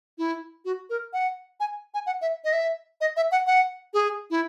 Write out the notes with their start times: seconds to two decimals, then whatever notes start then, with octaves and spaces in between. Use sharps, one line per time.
0.18 E4
0.65 F#4
0.90 A#4
1.13 F#5
1.60 G#5
1.94 G#5
2.06 F#5
2.22 E5
2.44 D#5
2.53 E5
3.01 D#5
3.17 E5
3.31 F#5
3.47 F#5
3.94 G#4
4.30 E4